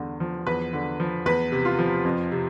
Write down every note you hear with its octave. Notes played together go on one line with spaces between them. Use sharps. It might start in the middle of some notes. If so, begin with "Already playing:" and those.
Already playing: E2 G2 D3
F3
E2 B4
D3
F3
E2 B4
C3
F4
F3
F2
C3